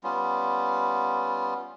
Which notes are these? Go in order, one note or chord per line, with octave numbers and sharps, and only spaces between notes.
G3 B3 C#4 F4